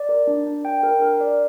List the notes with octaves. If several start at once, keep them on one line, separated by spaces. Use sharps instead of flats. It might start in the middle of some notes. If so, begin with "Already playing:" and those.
Already playing: D5
A#4
D4
D4
G5
A#4
A#4
D5